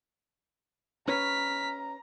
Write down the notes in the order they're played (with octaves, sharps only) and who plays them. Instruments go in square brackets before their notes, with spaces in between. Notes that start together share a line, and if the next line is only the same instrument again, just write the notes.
[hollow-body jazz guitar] C#4 B4 C#5 [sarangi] A#5 [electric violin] F6 B6